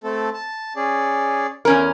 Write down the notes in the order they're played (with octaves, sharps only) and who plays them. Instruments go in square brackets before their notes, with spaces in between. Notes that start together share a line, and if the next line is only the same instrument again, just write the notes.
[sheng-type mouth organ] A3 C4 A4
A5
C#4 G#4 D5
[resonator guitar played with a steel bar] E2 C#4 A#4